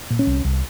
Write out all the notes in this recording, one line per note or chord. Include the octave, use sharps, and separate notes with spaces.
A#2
C#4
C2
C2